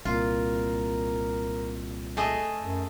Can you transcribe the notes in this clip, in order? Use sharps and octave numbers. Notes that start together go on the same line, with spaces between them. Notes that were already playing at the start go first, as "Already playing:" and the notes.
C2 A#2 F4 A#4
A3 G#4 D#5
F#2